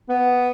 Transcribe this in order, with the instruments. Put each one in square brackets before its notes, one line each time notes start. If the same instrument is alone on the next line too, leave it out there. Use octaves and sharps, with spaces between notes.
[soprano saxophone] B3